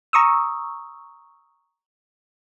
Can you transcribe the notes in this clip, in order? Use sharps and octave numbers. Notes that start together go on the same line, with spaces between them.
A#5 C#6 D#6 E6